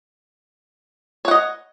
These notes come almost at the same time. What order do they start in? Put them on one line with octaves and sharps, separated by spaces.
C#5 F#5 D#5